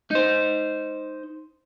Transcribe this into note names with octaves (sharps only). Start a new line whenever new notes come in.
D#4 C5